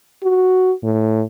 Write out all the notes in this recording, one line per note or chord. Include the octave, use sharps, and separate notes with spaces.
F#4
A2